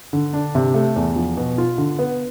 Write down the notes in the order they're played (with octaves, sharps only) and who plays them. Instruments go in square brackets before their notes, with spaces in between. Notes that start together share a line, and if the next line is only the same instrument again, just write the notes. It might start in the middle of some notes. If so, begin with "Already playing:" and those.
[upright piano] D3
D4
C3
A3
E2
F3
B2
F4
D3
B3